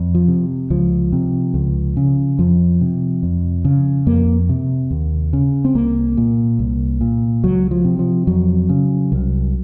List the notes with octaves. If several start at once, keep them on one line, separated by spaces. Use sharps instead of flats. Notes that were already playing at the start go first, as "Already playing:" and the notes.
Already playing: F2
F3
C3
C#2 F3
C3
C#2
C#3
F2 F3
C3
F2
C#3
F2 A#3
C3
D#2
C#3
C4
C2 A#3
A#2
C2
A#2
C#2 F#3
F3
C3
F3
F2 F#3
C#3
C2